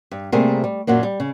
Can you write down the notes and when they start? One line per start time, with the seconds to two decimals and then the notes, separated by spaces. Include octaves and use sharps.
0.12 G2
0.32 C3 G3 A3 A#3 G#4 A#4
0.64 G3
0.87 F#2 A#2 F#3 A#3
1.03 G3
1.20 C#3